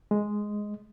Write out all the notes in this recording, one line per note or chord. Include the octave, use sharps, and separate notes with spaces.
G#3